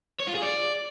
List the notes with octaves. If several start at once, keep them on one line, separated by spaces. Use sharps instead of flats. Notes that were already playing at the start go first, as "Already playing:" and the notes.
C#5
F4
G#4
D5